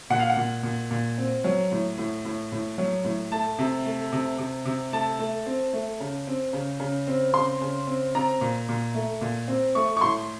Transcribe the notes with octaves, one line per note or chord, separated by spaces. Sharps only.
A#2 F#5
F5
F#5
A#2
A#2
A#2
C4
F#3
A2
A2
A2
A2
F#3
A2
A3 A5
C3
A3
C3
C3
C3
A3 A5
A3
C4
A3
C#3
C4
C#3
C#3
C4
C#3 C6
C#3
C4
C4 A#5
A#2
A#2
A3
A#2
C4
A3 C#6
C#6
A2 C6